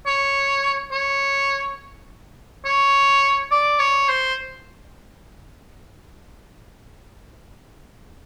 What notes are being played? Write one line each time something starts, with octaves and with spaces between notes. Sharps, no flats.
C#5
C#5
C#5
D5
C#5
C5